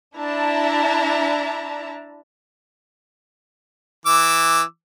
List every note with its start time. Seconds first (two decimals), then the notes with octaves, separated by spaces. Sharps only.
0.17 D4 E4 E5 A5 A#5
4.06 E3 D6 E6